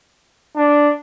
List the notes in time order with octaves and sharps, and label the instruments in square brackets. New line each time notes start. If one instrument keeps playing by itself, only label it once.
[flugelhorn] D4